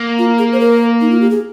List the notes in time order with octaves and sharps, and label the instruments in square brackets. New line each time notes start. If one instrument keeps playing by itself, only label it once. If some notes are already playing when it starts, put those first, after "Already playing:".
Already playing: [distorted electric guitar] A#3
[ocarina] F4
G#4
C5
A#4
D#4
F4
G4
G#4